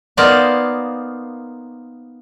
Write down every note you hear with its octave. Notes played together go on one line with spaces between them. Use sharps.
A#3 B3 D#4 C5 D5 F5